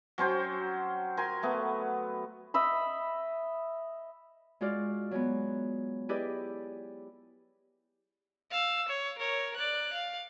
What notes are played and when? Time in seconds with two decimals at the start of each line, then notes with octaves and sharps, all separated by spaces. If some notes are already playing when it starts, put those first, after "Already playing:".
0.18 F#3 C#4 C5 G5
1.17 A#4 G#5 C6
1.43 A3 B3
2.54 D#5 E5 B5
4.61 G#3 F4 F#4 D5 F6
5.11 F#3 G#3 B3
6.09 E4 G4 G#4 B4 D5 D#5
8.50 F5 E6
8.89 C#5
9.19 A#4 C#5
9.56 D5 F#6
9.94 F5